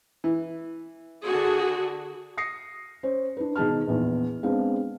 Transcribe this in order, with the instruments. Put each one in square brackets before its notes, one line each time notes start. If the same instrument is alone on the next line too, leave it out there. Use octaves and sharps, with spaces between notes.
[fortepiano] E3
[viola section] D3 F#4 G#4
[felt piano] D#6 A#6 C7 C#7
C#4 C5
D4 B4
B2 D#3 G#4 A5 F6
A#1 E2
G#3 B3 C4 D4 F5